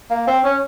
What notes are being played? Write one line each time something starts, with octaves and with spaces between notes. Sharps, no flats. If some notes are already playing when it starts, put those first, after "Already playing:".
A#3
C4
C#4